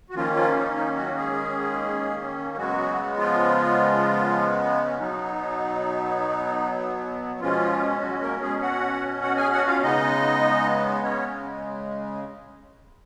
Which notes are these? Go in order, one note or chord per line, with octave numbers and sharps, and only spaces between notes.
F#4
D#3 F3 A#3 C#4 F4
F3 F4
D#4
D#4
F#3 F#4
G#3 G#4
C#3 F#3 G#3 B3 F#4
F3 F4
C#4
B2 F#3 B3 D#4
B2 F3 G#3 C#4 F4
F#3 F#4
A#3 A#4
G#3 G#4
F#4 F#5
F#4 F#5
G#4 G#5
F#4 F#5
F4 F5
C#3 G#3 B3 D#4 D#5
C#4 C#5